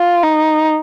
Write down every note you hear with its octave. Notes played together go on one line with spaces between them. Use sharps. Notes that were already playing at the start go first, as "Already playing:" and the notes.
Already playing: F4
D#4